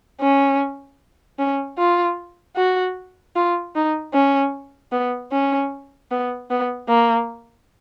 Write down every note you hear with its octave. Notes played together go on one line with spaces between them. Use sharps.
C#4
C#4
F4
F#4
F4
D#4
C#4
B3
C#4
B3
B3
A#3